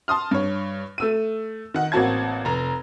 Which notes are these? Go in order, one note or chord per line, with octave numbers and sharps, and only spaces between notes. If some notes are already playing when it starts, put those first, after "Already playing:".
A5 C6 D#6 F6
G2 C#5
A3 E6 D#7
D#3 F#5
A1 A#3 C4 F#4 A5 G#6
F1 A#5